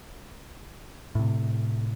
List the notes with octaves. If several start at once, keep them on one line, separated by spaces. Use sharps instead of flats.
A2 C3